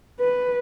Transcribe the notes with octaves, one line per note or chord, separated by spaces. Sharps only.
B4